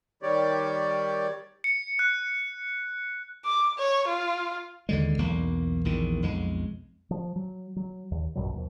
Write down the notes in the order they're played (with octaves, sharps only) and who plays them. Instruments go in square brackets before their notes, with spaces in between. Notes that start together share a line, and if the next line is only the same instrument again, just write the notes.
[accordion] D#3 G3 G4 C#5 D5
[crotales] C#7
F#6
[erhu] D6
C#5
F4
[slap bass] D#2 D3 G#3
B1 E2 A#3
A#1 E2 D#3
B1 F2 G#3
[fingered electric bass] F3
F#3
F#3
D#2
A#1 F#2 B2 F#3
D#2 F3